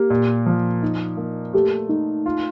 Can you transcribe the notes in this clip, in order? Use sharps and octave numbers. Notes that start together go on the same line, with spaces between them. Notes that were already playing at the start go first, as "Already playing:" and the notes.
Already playing: A#3 G4
A#2
F3
D#4
A#3
A3 G4
A3 D#4
F4